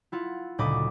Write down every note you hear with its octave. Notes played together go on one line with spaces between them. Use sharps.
E4 F4 F#5
F#1 D2 A#2 D#5 B5 D6